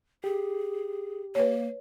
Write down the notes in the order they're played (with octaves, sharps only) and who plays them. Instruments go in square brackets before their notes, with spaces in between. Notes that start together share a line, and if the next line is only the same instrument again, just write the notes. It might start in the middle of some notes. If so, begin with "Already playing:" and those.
[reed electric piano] G4 [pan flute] G#4
[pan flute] A#3 [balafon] B4 C#5